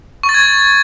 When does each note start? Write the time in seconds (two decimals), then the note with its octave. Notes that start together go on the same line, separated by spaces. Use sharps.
0.23 C#6
0.29 A6
0.34 G#6